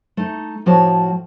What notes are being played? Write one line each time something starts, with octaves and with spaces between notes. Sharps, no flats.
A3 D#4
A2 F3 F#4 C#5 A5